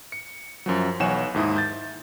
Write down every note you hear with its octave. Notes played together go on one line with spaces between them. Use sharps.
C#7
F#2 F3 F#3
B1 E3 C#5 F#5 G#5 E7
D#2 G#2 E4 D#6
G6 A6